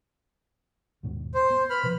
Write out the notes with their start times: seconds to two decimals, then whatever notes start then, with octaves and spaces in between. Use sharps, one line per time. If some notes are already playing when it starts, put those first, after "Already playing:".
1.03 D#2 G#2 B2
1.34 C5
1.50 B3
1.70 B4 B5 F6
1.83 B2 F3 B4